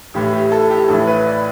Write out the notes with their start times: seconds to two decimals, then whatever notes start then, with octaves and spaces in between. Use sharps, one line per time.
0.14 A1 A2 E3 G4
0.33 G4
0.52 A4
0.70 G4
0.88 A1 A2 E3 A4
1.07 B4
1.26 D5